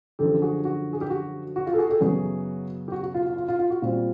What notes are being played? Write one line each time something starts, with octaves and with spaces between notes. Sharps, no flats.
F#2 D3 F3 G4 A4
F#4 G#4
F#4
G#4
G4
F#4
F#4
F4 G4
A4
F#4 G#4
G4 A4
F#2 C#3 F#3 B3 F#4 G#4
G4
F#4
F#4
F4
F4
F4
F4
F4
F#4
A#2 G3 C4 F4